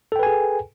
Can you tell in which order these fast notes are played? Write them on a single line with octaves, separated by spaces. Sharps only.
A4 G5 B4 G#5 G#4